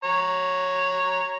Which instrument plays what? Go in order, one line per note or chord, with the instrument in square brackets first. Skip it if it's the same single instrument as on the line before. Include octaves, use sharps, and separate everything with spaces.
[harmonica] C#5 A#5